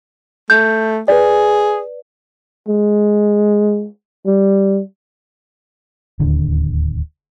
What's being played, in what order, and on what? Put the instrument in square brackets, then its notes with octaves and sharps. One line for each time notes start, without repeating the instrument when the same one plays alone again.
[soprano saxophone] A3 [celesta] G6
[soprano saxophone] G#4 [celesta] B4 D5
[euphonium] G#3
G3
[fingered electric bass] D1 D#2 D3